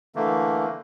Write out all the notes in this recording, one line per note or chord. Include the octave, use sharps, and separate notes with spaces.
D3 E3 A3 A#3